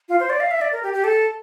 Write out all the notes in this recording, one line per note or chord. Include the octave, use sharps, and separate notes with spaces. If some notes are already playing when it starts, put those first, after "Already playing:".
F4
C5
D5
F5
E5
D5
A#4
G4
G4
A4